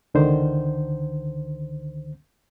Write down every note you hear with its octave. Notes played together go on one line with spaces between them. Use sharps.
C#2 D3 D#3 C5